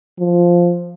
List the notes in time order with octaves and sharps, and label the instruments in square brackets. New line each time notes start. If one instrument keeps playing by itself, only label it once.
[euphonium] F3